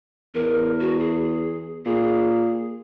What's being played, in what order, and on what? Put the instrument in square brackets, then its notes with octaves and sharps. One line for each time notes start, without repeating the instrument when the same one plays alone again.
[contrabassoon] E2 [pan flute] A#4
[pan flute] F#4
G#4
[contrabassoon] A#2 [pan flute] G#4